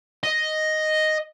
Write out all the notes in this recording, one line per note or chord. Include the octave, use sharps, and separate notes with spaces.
D#5